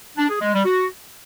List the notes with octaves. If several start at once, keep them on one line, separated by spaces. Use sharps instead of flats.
D4
G#4
G#3
G3
F#4